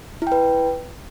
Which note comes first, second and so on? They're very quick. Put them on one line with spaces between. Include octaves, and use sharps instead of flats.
E4 G5 B4